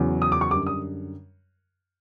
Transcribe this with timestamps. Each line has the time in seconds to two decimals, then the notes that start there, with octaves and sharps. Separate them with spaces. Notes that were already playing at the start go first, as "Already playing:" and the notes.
Already playing: E2 C#3 F#3
0.22 D#6
0.32 D6
0.41 C#6
0.51 F#2 D3 G3 D6
0.67 D#6